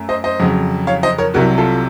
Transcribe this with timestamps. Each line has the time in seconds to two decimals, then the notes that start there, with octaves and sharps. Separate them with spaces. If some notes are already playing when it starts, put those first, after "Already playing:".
Already playing: F#2 A3
0.09 C5 D#5
0.24 C5 D#5
0.40 F2 C#3 F#3
0.87 C#5 F5
1.03 C5 D#5
1.18 A#4 C#5
1.34 C2 C3 F#3 F#4 A#4
1.58 F4 A4